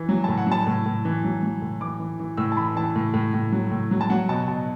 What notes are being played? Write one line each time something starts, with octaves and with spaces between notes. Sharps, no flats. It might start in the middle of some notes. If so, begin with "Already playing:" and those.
Already playing: E3
F#3
A2 A5
F#5
F#3 A5
A2
A2
E3
F#3
F#3
A2
E3 D6
E3
E3
A2 E6
A5
E3 B5
E3 A5
A2
A2
A2
F#3
A2
F#3
A5
F#3 F#5
B2 A5
B2 A5